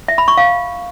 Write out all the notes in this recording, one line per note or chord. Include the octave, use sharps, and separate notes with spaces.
E5
B5
C#6
F5